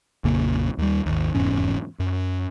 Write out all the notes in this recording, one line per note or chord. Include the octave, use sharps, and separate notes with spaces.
A#1 F2 C#3 A#3
D#2 G3
G#1 D#2
F1 E2 G#2 C#4
F#2